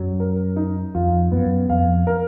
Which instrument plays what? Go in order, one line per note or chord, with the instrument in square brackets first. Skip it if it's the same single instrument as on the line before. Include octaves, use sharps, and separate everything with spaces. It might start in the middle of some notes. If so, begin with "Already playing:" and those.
Already playing: [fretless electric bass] F#2 [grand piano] F#3
[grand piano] A#4
D#4
[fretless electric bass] F2 [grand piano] F4
[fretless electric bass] F#2 [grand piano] B3
[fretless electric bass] F2 [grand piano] F5
[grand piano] A#4